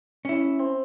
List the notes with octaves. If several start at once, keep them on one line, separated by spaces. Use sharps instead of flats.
C#4 E4
C4